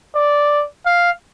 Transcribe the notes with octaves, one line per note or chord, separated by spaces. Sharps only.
D5
F5